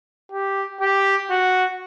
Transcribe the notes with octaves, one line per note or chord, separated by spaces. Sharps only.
G4
G4
F#4